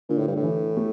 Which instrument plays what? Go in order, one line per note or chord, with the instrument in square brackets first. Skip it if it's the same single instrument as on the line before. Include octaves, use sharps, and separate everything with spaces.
[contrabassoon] A#2 [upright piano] D3
[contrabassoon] A2
G2
A2
[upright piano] E3
A3